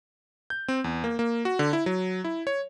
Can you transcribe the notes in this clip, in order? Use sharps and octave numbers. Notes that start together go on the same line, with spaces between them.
G6
C4
E2
A#3
A#3
F#4
D3
E4
F#3
E4
C#5